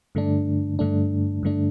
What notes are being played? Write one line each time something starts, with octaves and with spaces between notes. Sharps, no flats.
G2 D3 A3 D4
G2 D3 A3 D4
G2 D3 A3 D4